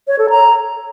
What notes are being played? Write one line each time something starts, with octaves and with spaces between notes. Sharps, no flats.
C#5
A4
A#5